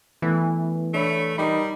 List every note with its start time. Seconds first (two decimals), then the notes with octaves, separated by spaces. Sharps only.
0.22 E3 A3 B3 E4
0.94 A3 D4 C#5 B5
1.38 G3 D#4 A#4 A#5 B5